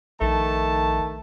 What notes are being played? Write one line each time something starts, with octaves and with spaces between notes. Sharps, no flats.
A#1 D#3 A3 A5